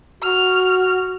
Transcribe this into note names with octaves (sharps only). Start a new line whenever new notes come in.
F#4 F6